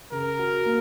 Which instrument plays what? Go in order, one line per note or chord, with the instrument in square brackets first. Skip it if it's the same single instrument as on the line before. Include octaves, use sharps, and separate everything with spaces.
[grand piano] C#3 [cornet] A#4
[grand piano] F#4
A#3